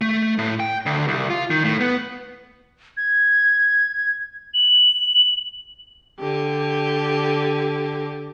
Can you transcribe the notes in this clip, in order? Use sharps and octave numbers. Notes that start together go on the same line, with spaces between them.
A3
A2
G5
D2
C2
F4
D#3
A2
B3
G#6
F#7
D3 G4